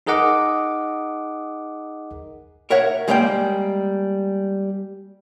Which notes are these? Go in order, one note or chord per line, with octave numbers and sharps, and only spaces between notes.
D#4 G#4 A#4 D#5 F#5 D6
A#4 C#5 E5 F#5
G3 G#3 A#3 D5 E5 G5